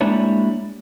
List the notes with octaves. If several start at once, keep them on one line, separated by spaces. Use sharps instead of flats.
G3 G#3 A#3 D4 E4 C#5